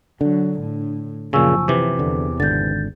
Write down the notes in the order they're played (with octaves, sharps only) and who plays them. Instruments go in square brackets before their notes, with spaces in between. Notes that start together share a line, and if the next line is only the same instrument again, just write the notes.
[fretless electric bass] D3 [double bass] F#3 [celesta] D4
[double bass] A2
[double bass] F#1 F3 [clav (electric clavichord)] A#2 C#3 [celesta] G#5 C#6 E6
[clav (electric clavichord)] C3 E3 [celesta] D6
[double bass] E2 [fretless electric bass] D3
[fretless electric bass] G#1 D3 [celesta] G6 A6